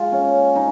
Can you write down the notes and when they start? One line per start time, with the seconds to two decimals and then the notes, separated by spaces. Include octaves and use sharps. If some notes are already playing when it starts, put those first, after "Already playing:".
Already playing: G#3 F4
0.12 C#4
0.56 D#4